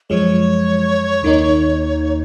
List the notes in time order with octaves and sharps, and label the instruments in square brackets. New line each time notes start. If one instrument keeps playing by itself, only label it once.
[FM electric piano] F#2 F3 G#3 [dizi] C#5
[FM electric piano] D#2 D#3 A#3 D#4